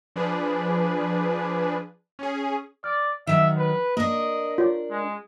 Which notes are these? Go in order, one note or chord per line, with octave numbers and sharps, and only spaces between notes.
F3 D4 G#4 B4
C#4 G#4
D5 F6
D#3 F#3 E5
B4
A#3 D4 A#4 D#5
F4 C#5 D5
G#3